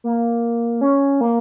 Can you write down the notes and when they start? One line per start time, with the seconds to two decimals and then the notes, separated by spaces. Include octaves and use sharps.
0.04 A#3
0.81 C#4
1.21 A#3